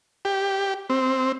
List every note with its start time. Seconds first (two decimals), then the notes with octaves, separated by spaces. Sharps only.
0.25 G4
0.90 C4